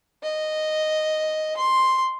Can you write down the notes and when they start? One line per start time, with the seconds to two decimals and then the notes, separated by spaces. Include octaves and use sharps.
0.23 D#5
1.57 C6